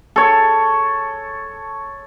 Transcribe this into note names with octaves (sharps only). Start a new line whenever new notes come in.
A4 C#5